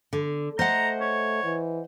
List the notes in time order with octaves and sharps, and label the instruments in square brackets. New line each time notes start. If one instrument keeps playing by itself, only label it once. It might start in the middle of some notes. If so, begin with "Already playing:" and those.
[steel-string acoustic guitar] D3
[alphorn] A3 [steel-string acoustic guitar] C5 D#5 F#5 [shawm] A#5
[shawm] C#5
[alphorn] E3